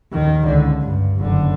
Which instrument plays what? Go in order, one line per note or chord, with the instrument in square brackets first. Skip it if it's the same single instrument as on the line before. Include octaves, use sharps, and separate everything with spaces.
[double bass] D#2 D#3
C#2 D3
G2
F#1 D3